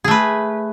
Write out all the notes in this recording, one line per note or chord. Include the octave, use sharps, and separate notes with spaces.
A3 G#4 B4